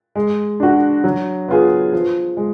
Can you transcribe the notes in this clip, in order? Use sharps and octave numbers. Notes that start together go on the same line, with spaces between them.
G#3
D4 F#4
F#3
B3 F4 G#4
F3
G#3